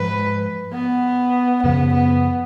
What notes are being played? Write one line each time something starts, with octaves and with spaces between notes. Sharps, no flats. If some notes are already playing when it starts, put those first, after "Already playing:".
Already playing: G#2 F3 G#3 B4
B3
F#2 C#3 F3 B3
B3